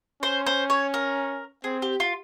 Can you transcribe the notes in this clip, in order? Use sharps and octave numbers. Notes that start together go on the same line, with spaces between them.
C#4 C5
C5
C#5
A#4
C4 G#4
G4
F4